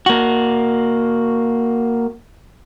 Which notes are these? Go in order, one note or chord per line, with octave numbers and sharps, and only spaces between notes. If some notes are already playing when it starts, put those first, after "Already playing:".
A#3 F#4